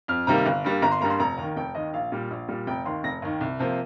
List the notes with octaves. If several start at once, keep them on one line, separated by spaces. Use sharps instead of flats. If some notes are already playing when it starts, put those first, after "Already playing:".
F2 F6
C3 D#3 G3 A#3 A#5
G1 F5
G2 G3 A#3
G1 A#5
C6
G2 G3 A#3 A#5
C6
F1 A#5
D#2 D#3
F1 G5
D#2 D#3 D#5
A#1 F5
A#2 G3
A#1
A#2 G3
F1 G5
D#2 D#3 C6
F1 A#6
D#2 D#3
C2
C3 F3 A#3